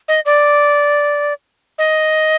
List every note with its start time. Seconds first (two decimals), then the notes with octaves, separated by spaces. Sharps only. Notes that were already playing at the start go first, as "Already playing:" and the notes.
0.08 D#5
0.25 D5
1.78 D#5